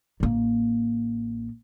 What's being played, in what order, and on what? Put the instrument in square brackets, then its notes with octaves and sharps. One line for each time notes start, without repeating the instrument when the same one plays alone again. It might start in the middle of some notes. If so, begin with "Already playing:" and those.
[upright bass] A1 A#3